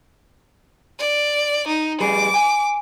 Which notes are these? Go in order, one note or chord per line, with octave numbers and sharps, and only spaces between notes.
D5
D#4
G3 G#4 B4 D6
G#5